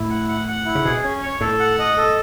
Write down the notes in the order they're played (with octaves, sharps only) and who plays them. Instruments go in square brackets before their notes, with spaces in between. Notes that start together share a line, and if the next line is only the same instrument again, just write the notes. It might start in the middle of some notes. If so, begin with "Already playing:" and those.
Already playing: [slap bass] A2 [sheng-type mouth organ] E4
[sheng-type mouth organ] F#5
F#5
F#5
E4
[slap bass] C#3
[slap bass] B2 [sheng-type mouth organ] G#4
[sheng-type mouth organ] C#4
C#5
[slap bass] A2 [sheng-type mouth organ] A4
[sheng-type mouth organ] F#5
D#5
A4